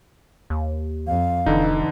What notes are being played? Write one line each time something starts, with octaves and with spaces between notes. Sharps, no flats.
D#2
F2 F5
E1 D3 E3 D#4